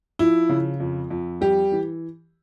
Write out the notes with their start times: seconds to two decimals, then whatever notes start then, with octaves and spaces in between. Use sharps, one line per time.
0.19 F3 E4
0.49 C#3
0.80 F2
1.10 F2
1.41 G3 G4
1.72 E3